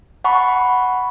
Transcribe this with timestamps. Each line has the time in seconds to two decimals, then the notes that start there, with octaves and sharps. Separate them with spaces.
0.24 F#5 A5 B5 C#6